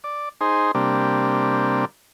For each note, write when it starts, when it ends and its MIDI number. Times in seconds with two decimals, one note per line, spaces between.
0.04 0.29 74
0.41 0.71 63
0.41 0.71 68
0.41 0.71 72
0.75 1.85 48
0.75 1.85 55
0.75 1.85 58
0.75 1.85 62